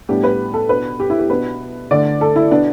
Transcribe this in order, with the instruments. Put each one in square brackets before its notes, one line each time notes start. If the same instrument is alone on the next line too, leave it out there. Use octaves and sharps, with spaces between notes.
[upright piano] A2 G3 B3 D4 G4
B4
A4
B2 B3 D4 B4
G4
E4
G4
B2 B3 D4 B4
D3 A3 D4 D5
A4
E4
B2 B3 D4